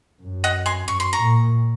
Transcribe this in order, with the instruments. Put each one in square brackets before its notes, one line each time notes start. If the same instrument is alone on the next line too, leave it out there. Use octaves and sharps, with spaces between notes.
[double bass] F#2
[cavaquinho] D#5 F#5
G#5 C6
[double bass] F#2 [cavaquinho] C#6
[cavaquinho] C6
A#5 C#6
[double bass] A#2